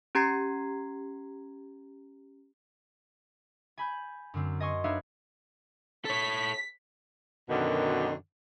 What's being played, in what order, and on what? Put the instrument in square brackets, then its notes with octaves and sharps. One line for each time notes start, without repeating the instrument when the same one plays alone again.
[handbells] C#4 G4 A#5 G#6 C7
[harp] G#5 B5 G6
F#2 D3 C4
D#5 G#5 C6 C#6
D4 D#4 B4 C#5 E5 F5
[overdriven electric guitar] A4 C#5 [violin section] B6
[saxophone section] F#2 B2 D3 D#3